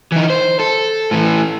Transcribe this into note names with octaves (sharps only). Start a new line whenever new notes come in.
E3 D#4
C5
A4
A2 E3